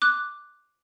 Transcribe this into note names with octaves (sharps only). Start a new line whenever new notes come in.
D6 F#6